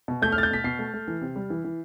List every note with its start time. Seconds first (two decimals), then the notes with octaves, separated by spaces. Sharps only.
0.08 B2
0.22 A3 G6
0.32 F6
0.36 A3 A6
0.43 G6
0.51 B2 B6
0.64 B2 C7
0.79 A3
0.94 A3
1.08 E3
1.21 C3
1.36 G3
1.50 E3
1.64 E3